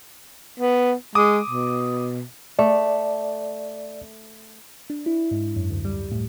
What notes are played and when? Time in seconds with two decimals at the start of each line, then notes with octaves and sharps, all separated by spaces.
0.60 B3
1.15 G#3 D6 D#6
1.50 B2
2.59 A3 D5
4.90 D4
5.06 E4
5.31 G#2
5.56 F#2
5.70 D2
5.85 G3
6.12 A2